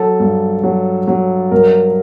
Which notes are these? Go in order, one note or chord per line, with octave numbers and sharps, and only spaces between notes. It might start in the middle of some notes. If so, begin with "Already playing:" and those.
Already playing: F#3 A4
G2
F#3
F#3
G2 A#4